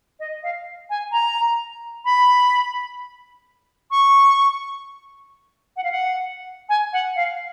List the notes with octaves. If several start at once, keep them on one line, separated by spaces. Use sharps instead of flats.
D#5
F5
G#5
A#5
B5
C#6
F#5
F5
F#5
G#5
F#5
F5